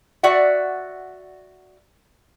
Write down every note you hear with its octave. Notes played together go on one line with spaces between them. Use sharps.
F#4 D5 E5 F#5